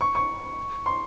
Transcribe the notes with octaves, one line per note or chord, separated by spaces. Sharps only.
C#6
C#6
C6